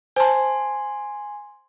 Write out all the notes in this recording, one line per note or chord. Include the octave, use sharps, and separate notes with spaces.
C5 G#5 A5 C6